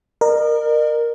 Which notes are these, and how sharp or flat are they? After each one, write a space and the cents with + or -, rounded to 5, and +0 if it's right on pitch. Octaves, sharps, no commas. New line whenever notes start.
A#4 +0 D#5 -45